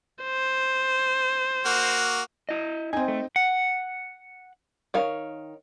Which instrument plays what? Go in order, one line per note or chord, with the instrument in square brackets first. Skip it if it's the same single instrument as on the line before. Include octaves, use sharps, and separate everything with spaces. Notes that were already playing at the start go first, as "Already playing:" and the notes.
[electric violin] C5
[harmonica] A#3 F#4
[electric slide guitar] E4 D#5
[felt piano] C4 D#4 [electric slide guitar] G#5
[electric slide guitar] A3
[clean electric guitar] F#5
[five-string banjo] D#3 C#5 F5